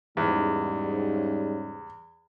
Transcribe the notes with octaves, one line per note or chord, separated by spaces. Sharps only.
E2 G#2 C#3 G3